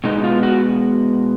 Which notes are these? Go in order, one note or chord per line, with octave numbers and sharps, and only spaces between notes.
B2 G#3 B3 D#4
F4
F#4